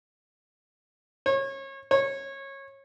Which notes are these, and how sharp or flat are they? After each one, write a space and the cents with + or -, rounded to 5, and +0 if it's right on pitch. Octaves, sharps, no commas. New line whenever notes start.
C#5 -30
C#5 -20